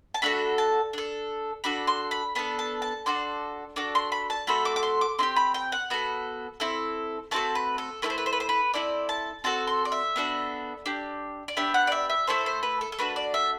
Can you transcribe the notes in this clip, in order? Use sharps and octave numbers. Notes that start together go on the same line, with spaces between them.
A5
A3 D4 F#4 A4 B5
A5
D4 A4
D4 F#4 A4 B5
C6
B5
B3 D4 A4 A5
A5
A5
D4 F#4 A4 C6
D4 F#4 A4 D6
C6
B5
A5
A3 C4 F#4 A4 B5
D6
D6
C6
D6
C4 E4 G4 C6
B5
G5
F#5
B3 F#4 A4
C4 E4 A4
A3 C4 F#4 A4 A5
B4
A4
A3 E4 A4 B4
C5
B4
C5
B4
C5
B4
C4 E4 A4 D5
A5
C4 F#4 A4 A5
C6
D5
E5
B3 D4 F#4 A4
D4 G4
D5
B3 D4 G4 E5
F#5
D5
E5
E5
A3 E4 A4 C5
C5
B4
A4
A4
A3 D4 F#4 B4
D5
E5